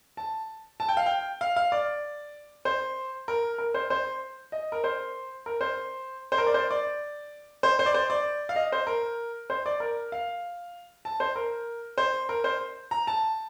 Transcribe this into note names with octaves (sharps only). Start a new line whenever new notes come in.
A5
A5
G5
F5
G5
F5
F5
D5
C5
A#4
A#4
C5
C5
D#5
A#4
C5
A#4
C5
C5
A#4
D5
C5
D5
C5
C5
D5
C5
D5
F5
D#5
C5
A#4
C5
D5
A#4
F5
A5
C5
A#4
C5
A#4
C5
A#5
A5